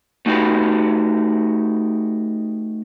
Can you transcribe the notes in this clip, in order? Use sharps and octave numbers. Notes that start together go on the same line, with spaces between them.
A3 D#4 F#4 G4 B4